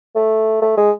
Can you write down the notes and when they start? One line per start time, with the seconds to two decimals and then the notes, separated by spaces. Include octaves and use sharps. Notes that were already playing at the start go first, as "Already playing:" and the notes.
0.15 A3
0.62 A3
0.77 G#3